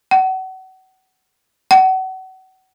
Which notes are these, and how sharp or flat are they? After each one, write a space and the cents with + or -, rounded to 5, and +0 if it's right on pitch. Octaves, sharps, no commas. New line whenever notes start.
F#5 +35
F#5 +35